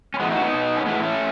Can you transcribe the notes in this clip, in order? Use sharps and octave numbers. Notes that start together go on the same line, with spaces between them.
C#4
A2 E3 G#3 B3
D#4 F#4
B3 D#4
B2
C#4
A2 E3 G#3 B3
A3 C#4